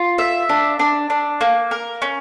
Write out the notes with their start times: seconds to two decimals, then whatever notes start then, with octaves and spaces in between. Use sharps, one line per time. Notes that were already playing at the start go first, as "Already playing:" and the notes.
Already playing: F4
0.18 E5
0.49 D4
0.79 D4
1.10 D4
1.41 A#3
1.71 A#4
2.02 C#4